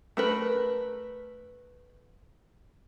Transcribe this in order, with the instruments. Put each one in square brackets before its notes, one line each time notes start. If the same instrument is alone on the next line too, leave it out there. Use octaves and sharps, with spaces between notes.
[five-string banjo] A3 A#4 B4